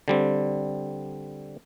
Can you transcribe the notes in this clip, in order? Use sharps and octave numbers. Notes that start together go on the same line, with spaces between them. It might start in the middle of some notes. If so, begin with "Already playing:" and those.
D3 G3 C4